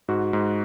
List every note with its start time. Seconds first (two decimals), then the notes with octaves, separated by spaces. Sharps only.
0.08 G#2 F#4
0.33 G#2